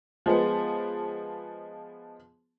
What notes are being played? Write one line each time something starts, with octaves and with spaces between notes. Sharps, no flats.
F3 G#3 B3